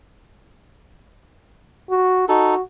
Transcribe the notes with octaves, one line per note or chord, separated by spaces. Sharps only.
F#4
D#4 F#4 A4